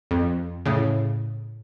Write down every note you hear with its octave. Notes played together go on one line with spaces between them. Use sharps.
F2
A2 C#3